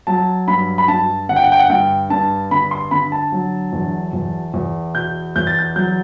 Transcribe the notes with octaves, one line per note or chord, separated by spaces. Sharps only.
F#3 A5
G2 B5
B5
G2 A5
D3 F#5
G5
F#5
G5
F#5
G2 G5
G2 A5
D3 B5
C6
D3 B5
A5
F#3
E2
E2
E2
B2 G6
E2 G6
A6
G6
F#3 G6